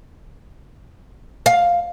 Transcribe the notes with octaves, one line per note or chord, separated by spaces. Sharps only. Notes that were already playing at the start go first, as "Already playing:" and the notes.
F5